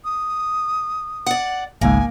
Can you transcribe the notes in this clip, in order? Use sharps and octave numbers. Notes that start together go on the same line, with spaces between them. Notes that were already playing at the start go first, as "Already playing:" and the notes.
D#6
D5 F#5
G#1 C#2 G#2 A#3 G#5